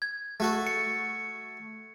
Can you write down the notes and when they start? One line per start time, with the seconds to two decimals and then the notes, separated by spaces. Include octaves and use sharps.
0.02 G#6
0.40 A3 F#4 A4
0.67 C#7